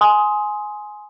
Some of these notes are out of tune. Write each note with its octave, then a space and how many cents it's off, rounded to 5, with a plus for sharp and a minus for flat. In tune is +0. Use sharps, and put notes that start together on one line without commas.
G#5 +15 C6 +0 D#6 +15